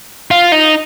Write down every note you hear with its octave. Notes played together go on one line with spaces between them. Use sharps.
F4
D#4